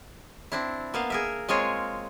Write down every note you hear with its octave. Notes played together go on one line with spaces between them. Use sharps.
C4 D4 E4
A#3 B3 F5
G#4 A#4 E5
G#3 C4 F4 G#4 A#4 C#5